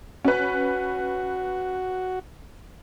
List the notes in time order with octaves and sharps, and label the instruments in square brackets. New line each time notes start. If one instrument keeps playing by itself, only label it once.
[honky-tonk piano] C#4 B4 [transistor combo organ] F#4